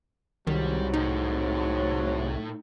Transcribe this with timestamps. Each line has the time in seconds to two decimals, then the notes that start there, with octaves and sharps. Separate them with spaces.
0.47 C2 G#2 D#3 F#3 G3
0.94 A2 D#4